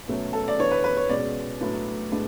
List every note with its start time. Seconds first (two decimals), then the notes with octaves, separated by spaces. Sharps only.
0.08 B2 F#3 A3 C#4
0.33 A4
0.48 D5
0.59 E3 B3 D4 C#5
0.71 B4
0.84 B4
0.97 C#5
1.09 B2 G#3 C#4 D5
1.61 A2 F#3 B3 D4
2.12 A2 G#3 B3 D4